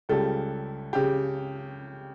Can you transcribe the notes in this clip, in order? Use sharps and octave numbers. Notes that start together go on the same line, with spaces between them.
C#2 C#3 G3 A4
C#3 G4